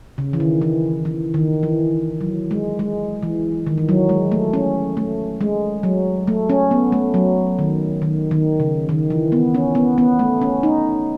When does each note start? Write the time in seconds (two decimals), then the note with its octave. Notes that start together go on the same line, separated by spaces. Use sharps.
0.18 C#3
0.33 E3
0.40 D#3
0.62 E3
1.05 E3
1.34 D#3
1.63 E3
2.21 F#3
2.51 G#3
2.79 G#3
3.23 E3
3.67 D#3
3.78 E3
3.89 F#3
4.09 G#3
4.32 A3
4.53 C#4
4.97 A3
5.41 G#3
5.83 F#3
6.27 A3
6.49 C#4
6.71 B3
6.92 A3
7.14 F#3
7.59 D#3
8.02 D#3
8.31 D#3
8.60 C#3
8.89 D#3
9.10 E3
9.32 B3
9.55 C#4
9.75 B3
9.98 B3
10.19 A3
10.41 C#4
10.63 D#4